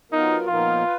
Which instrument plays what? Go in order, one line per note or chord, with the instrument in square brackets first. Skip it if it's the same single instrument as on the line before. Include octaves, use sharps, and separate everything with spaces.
[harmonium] F#3 B3 F4 A#4 [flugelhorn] D#4
[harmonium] A#2 F3 B3 D#4 A#4 [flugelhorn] F4
[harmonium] B4